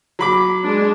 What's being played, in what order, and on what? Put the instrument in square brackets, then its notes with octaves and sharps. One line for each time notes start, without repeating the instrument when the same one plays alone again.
[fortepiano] F#3 B5 D6
[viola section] G#3 D4